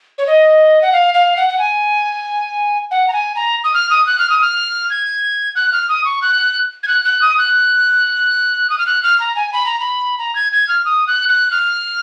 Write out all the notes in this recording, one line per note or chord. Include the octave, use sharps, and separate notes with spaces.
C#5
D#5
F#5
F5
F5
F#5
F#5
G#5
F#5
A#5
G#5
A#5
D#6
F6
D#6
F#6
F6
D#6
F6
G#6
F#6
F6
D#6
C#6
F#6
G#6
F#6
F#6
D#6
F#6
D#6
F6
F#6
F6
A#5
G#5
B5
A#5
B5
A#5
G#6
G#6
F6
D#6
F#6
F#6
F6